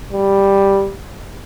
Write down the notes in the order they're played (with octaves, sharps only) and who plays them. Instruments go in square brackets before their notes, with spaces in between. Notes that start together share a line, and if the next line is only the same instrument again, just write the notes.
[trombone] G3